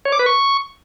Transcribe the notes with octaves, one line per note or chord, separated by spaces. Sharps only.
C#5
D6
B4
C#6